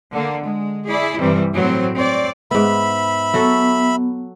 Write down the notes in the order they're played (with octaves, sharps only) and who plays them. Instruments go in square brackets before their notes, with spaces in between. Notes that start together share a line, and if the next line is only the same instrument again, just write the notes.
[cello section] D3 A#3
G#3
E4 G#4 D5
G2 C3 E3 G3
A2 F#3 C4
C4 C#5 D5
[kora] G#2 B3 [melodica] E5 B5
[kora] F#3 F#4 A4 [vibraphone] B3